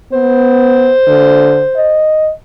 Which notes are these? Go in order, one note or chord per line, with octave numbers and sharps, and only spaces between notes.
B3 C5
D3
D#5